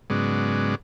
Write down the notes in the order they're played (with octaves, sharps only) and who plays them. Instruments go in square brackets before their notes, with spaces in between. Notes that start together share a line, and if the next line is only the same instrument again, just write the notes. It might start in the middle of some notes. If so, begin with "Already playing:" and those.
[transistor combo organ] G#2 C#3 F#3 G#3 B3 D5